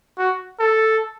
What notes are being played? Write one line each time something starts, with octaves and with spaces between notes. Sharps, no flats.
F#4
A4